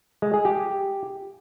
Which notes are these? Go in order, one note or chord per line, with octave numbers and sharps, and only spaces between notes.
G#3
G#4
G4